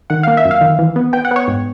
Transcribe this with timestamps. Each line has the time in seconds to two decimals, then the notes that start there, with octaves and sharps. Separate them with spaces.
0.10 D#3 F#5
0.23 A#3 F5
0.37 E5
0.45 F#2
0.51 F5
0.61 D#3
0.79 E3
0.96 B3
1.13 B3 G5
1.25 F#5
1.31 B3 C#5
1.48 G#2